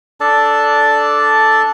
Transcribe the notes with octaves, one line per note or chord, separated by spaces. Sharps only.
D4 A4 D5 A5